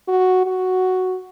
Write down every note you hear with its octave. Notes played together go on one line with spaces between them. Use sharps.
F#4
F#4